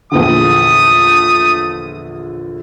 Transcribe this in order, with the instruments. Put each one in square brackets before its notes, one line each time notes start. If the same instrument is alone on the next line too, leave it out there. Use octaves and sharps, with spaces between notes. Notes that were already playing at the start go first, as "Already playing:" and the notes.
[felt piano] A#1 E2 D3 [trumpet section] A3 D#6